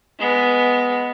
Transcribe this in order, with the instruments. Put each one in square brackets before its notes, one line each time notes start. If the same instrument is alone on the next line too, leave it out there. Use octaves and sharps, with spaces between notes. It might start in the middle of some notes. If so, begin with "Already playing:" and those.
[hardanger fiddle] G#3 B3